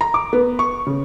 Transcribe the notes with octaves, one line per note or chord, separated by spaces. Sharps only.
A#5
D6
B3
C#6
C#3